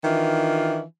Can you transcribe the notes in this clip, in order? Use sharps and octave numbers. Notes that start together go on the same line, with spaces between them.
D#3 E3 D4 F4